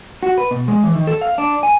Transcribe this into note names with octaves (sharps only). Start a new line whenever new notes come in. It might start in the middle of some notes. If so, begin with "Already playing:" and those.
F#4
B4
B2
G#3
E3
D#3
A4
F5
D4
G#5